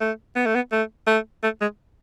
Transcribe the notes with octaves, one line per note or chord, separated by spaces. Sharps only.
A3
B3
A3
B3
A3
A3
A3
G#3